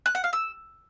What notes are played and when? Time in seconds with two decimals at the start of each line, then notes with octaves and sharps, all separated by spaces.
0.06 F#6
0.15 F#5
0.24 F5
0.33 E6